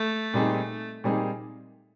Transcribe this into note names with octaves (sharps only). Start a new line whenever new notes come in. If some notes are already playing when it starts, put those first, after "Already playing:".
Already playing: A3
A#2 G3 C4 D#4 G#4
A#2 G3 C4 D#4 G#4